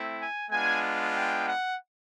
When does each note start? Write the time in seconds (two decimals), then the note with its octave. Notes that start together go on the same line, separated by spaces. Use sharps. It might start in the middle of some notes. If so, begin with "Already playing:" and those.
Already playing: A3 C4 E4
0.19 G#5
0.51 G#3 B3 D4 F4 G#5
1.14 G5
1.46 F#5